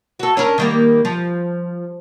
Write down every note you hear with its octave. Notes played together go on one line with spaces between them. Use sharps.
F#4 A4
C#4 D4 A#4
D#3 G3 A#3
F3